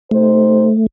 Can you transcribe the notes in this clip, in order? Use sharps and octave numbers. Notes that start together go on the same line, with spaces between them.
C3 A3 D#4 C5